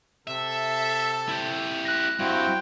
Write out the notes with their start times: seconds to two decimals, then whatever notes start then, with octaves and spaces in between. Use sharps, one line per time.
0.27 C3 A4 E5
1.29 E4 G4
1.85 F#6 A#6
2.19 G2 C4 E4 F#4 G5